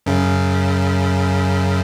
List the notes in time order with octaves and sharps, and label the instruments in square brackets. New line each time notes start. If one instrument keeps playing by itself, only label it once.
[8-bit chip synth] F#2 C#3